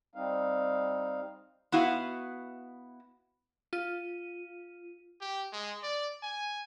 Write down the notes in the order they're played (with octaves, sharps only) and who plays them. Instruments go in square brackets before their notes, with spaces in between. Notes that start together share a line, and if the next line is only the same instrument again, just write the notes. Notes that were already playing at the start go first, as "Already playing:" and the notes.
[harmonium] G3 C4 D#4 F5
[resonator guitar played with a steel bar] B3 E4 F#4 F5
[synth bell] F4 D#7
[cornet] G4
G#3
D5
G#5